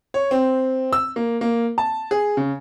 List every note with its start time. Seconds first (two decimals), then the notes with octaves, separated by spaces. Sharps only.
0.14 C#5
0.31 C4
0.93 E6
1.16 A#3
1.41 A#3
1.78 A5
2.11 G#4
2.37 C#3